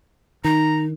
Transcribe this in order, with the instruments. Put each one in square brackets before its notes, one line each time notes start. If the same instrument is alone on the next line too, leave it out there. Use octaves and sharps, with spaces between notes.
[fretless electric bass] D#3 [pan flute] D#4 [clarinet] A#5